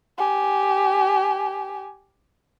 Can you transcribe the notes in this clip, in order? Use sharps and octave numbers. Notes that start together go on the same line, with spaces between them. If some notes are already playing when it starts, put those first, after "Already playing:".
G4 G#5